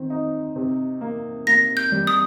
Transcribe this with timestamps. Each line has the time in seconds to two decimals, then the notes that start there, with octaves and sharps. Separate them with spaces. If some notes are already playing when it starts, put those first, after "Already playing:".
Already playing: D#3 C4
0.10 D#4
0.56 C3
1.01 A#3
1.47 A#3 A#6
1.77 G6
1.92 G3
2.07 D#6